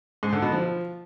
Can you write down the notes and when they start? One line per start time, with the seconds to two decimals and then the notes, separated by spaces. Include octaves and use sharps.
0.23 G#2
0.33 D3
0.42 B2
0.52 F3